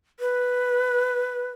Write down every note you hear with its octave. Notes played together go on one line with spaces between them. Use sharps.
B4